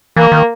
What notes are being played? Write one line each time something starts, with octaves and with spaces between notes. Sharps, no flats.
E3 A#3
D#3